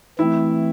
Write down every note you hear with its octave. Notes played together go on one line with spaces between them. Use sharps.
E3 A3 C4 E4